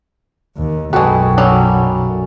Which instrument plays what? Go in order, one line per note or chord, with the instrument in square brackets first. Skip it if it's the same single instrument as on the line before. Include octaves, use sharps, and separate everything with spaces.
[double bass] D#2
[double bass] B1 F#2 [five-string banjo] G#3 B4 [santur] F#4 A4 [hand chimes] G5 G#5
[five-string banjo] F#3 G3